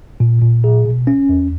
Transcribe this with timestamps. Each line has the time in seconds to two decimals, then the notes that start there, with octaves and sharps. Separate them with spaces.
0.20 A#2
0.42 A#2
0.64 G#4
0.85 B2
1.07 C#4
1.29 E2